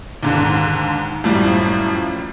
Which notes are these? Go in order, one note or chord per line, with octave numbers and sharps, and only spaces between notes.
D#2 G#2 D3
F#2 A2 F3 G3